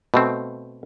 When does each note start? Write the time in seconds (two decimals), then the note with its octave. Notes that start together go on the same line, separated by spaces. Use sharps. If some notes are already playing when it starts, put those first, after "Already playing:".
0.14 B2 A3 C4